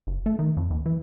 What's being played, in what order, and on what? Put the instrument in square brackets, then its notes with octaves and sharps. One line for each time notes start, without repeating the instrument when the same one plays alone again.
[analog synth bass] F#1
A3
D#3
F2
D#2
E3